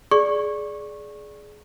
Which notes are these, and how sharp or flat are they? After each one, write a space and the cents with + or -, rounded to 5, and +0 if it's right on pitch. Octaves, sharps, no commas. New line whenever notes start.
G#4 +15 D5 -10 C#6 -15